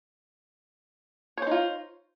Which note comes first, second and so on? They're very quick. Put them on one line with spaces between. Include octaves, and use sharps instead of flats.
C#5 C5 D#4 F4